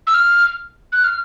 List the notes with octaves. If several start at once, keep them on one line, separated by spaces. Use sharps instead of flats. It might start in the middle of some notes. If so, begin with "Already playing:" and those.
E6
F6
F#6
F6